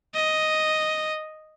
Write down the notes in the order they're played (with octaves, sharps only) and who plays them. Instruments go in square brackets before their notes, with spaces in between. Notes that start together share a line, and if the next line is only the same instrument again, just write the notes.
[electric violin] D#5